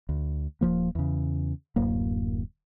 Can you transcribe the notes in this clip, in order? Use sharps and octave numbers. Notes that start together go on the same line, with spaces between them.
D2
D#1 D2 F3 A#3
E2 C#3
D1 F#2 A#3